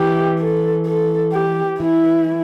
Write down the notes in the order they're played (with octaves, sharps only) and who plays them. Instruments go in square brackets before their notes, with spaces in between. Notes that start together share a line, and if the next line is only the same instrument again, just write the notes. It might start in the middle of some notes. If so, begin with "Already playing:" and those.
Already playing: [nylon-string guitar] E3 [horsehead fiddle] G4
[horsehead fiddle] A4
A4
G4
[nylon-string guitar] E3 [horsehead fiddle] E4